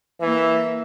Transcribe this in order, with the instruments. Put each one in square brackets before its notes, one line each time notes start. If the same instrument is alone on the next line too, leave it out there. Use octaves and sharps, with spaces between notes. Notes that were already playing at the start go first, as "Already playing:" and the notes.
[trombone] E3 [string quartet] A#3 E5